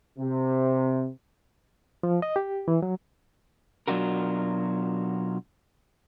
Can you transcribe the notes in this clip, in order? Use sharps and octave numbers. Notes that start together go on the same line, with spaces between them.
C3
F3
D#5
G4
E3
F#3
B2 F#3 D4 F4 F#4 A#4